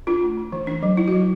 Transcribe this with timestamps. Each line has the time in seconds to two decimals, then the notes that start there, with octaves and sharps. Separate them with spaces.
0.07 D4 F4
0.23 A3
0.37 D4
0.52 E3
0.67 D4
0.83 F#3
0.97 F#3 E4
1.08 F#4
1.12 F#3